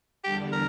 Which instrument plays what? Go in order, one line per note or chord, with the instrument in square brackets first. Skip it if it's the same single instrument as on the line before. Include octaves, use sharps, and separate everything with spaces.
[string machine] E2 D3 G3 D4 [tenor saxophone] G4
[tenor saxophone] A#4